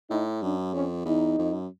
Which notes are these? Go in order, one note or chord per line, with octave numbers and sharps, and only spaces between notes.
A2 D#4
F#2 D4
F2 C#4
E2 D#4
F2
F#2